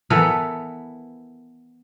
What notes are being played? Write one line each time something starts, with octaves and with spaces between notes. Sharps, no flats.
E3 B3 A4 A#4